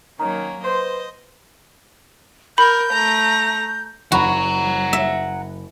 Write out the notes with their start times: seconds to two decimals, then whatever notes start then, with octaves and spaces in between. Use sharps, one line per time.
0.20 D#3 F#3 A#3 C#4 A#5
0.65 B4 C5 D#5 C6
2.58 A#4 B5 G6
2.92 A3 A#5
4.12 F#1 F#4 F#5 A#5 B5
4.93 E5